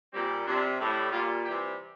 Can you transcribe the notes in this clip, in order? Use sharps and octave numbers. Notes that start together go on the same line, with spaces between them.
A#2 G3 C4
C3 G3 D4
A2 G3
A#2 G3 F4
C3 E3 G3 G4